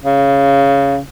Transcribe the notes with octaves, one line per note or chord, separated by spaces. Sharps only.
C#3